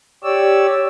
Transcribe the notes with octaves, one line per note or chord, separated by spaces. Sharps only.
G4 C#5 D5 E6